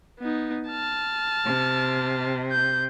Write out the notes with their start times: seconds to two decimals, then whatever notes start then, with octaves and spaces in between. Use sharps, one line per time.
0.19 B3 D#4
0.69 A5 F6
1.46 C3
2.52 G6